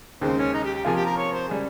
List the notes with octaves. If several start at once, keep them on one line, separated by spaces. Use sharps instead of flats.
D#2 C#3 G#3 C4
C#4
D#4
G4
G4
C3 F3 A#3 F4 G#4
G4
A#4
C#5
C5
C#3 G3 G#4